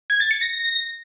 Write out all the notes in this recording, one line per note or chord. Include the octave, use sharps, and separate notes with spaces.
G#6
A6
C#7
A#6